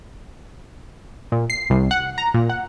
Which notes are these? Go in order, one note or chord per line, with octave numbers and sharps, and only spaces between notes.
A#2
C7
C2
F#5
A#5
A#2
F#5